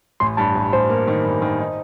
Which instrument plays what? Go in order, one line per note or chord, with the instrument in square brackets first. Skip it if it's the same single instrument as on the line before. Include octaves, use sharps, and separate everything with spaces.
[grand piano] A1 [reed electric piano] C6
[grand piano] G2 [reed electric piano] A5
[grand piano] A1
[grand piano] A1 [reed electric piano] C5
[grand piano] A#3
D#3
G2
D#3
D#4